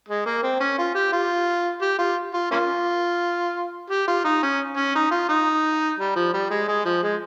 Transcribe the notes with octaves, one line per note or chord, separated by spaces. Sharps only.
G#3
A#3
C4
C#4
F4
G4
F4
G4
F4
F4
A#3 C#4 F4
G4
F4
D#4
C#4
C#4
D#4
F4
D#4
G3
F3
G3
G#3
G#3
F3
G#3